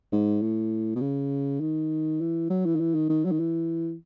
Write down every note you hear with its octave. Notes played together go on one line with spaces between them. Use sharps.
G#2
A2
B2
C#3
D#3
E3
F#3
E3
D#3
E3
D#3
D#3
F#3
D#3
E3